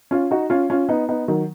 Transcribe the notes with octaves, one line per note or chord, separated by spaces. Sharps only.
C#4 F4
D#4 F#4
C#4 F4
C#4 F4
B3 D#4
B3 D#4
D#3 F#3